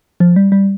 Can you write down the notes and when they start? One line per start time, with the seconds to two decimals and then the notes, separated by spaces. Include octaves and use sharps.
0.20 F3
0.36 G3
0.52 G3